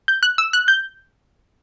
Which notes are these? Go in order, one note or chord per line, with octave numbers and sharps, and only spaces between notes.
G6
F#6
E6
F#6
G6